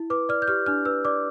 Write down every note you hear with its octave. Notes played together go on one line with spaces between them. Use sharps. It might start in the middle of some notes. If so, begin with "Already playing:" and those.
Already playing: E4
B4 D6
D5 F6
G6
G4 F6
D4 F6
B4 E6
D5 D6